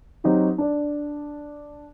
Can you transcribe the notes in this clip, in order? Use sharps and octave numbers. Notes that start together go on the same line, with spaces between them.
F#3 C4 D#4 F#4 G4
D4 D5